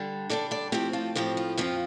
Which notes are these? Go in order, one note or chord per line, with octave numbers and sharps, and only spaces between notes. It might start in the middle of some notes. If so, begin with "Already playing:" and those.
Already playing: D3 G3 D4
D3 G3 D4 A4 D5
A4 D5
A2 F3 C4 G4 C5
F4 A4
A2 F3 C4 G4
F4
F2 F3 C4 F4